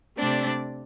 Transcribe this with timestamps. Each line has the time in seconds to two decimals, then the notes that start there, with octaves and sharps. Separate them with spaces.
0.17 C3 A3 C4 D4 D5